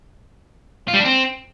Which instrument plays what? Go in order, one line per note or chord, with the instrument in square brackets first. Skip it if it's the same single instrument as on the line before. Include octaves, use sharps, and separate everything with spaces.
[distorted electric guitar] F4
G3
D4
C4